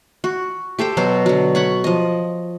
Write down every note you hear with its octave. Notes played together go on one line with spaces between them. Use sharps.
F#4
G4 A4 C5 G5
B2 F#3 C5
D3 F#3
C#5 F#5 B5
F3 D#5